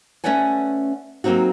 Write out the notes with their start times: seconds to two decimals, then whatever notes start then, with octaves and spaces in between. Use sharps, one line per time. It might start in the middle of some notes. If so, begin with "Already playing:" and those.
0.24 A3 C#4 B4 D5 F#5 G#5
1.24 F#3 A#3 C4 D#4 F#4